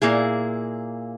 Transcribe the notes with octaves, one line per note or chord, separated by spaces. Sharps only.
A#2 A#3 E4 G#4